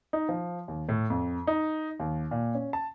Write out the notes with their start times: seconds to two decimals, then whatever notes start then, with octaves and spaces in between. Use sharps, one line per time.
0.13 D#4
0.29 F3
0.68 D#2
0.89 A2
1.10 F2
1.47 D#4
2.00 D#2
2.31 A#2
2.55 C#4
2.73 A5